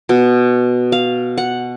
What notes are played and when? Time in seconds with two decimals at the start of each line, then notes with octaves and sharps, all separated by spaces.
0.09 B2
0.92 F5
1.37 F#5